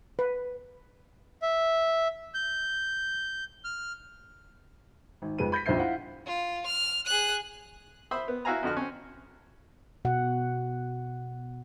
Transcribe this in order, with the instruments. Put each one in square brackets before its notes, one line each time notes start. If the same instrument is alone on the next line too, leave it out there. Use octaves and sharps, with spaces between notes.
[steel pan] B4
[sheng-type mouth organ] E5
G6
F6
[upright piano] G#1
F2 G#3 B4 D#7
B5 G6 A#6 B6
A#1 F2 C5 E5 G6 C7
E4 F4 F#5
[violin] F4
F6
G#4 F#6
[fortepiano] C5 E5 B5 C6 D#6
B3
E4 F#4 E5 F5 G#5 A#5
F2 D3 F#4 F6
C4 C#4
[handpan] B2 F#4 F#5